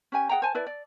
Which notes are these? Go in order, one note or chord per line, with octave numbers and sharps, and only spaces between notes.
C#4 G4 G#5
G#4 F#5 G5 A#5
C5 G#5 A5
E4 B4 D5
D5